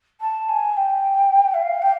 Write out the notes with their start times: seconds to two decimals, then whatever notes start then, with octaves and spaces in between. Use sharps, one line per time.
0.20 A5
0.48 G#5
0.76 G5
1.54 E5
1.62 F5
1.82 G5